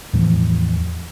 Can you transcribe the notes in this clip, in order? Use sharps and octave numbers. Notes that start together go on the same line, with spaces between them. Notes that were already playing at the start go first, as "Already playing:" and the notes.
E2 A2 E3 F3